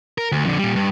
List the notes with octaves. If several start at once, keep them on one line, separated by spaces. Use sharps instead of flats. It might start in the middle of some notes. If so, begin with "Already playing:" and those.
A#4
D2
F2 D3
A#2 G3
G2